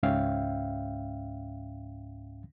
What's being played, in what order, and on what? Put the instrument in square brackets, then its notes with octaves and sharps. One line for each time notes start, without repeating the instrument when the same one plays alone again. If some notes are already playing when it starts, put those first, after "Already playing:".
[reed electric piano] C#2 G#2 C#4 E5 F5 G5